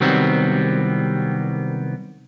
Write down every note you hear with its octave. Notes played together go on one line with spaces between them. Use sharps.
C2 D#3 F#3 G3 B3 C4